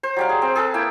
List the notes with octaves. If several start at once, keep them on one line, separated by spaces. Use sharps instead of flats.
C5
F#3 G3 F5
G#4
C4
G#4 A4 B4
A#3 E4 G5